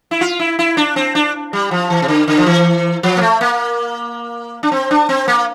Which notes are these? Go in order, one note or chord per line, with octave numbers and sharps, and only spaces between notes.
E4
F4
E4
E4
D4
C4
D4
G3
F3
E3
C3
D3
D3
F3
E3
F3
A#3
A3
A#3
D4
C4
D4
C4
A#3